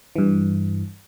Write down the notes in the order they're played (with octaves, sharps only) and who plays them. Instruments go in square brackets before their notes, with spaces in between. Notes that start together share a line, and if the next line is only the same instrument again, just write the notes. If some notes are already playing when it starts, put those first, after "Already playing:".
[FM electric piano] G2 E3